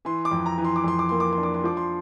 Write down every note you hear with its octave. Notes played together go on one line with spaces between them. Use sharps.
E3 C6
D6
F2
A#5
E3
C6
D6
F2 C6
D6
A#3 C6
D6
C6
D4
D6
C6
F3 D6
C6